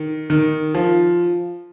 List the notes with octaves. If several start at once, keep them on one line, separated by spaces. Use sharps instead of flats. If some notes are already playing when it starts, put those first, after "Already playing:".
Already playing: D#3
D#3
F3